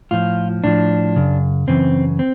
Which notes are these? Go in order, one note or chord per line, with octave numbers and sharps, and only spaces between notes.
A2 F3 F4
A2 F3 D4
F#2 C#3
F#2 C#3 E3 C4
C4